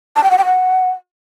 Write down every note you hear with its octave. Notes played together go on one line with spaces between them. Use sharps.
A5
G5
F#5
G5
F#5